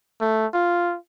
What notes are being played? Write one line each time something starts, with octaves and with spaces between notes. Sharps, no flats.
A3
F4